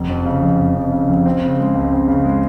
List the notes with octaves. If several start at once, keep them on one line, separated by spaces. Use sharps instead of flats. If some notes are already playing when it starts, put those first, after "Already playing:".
Already playing: F1
F2
C#3
F1
F1
F2
C#3
F1
C4
C#3
G#3
C#2
C4
C#3
G#3